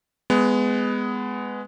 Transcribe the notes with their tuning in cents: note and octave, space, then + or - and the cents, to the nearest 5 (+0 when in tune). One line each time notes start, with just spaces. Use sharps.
G#3 +0 B3 +15